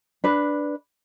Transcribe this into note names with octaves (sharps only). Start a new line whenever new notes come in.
D4 B4